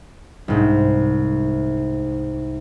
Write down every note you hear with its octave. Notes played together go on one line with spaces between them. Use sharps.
C2 G#2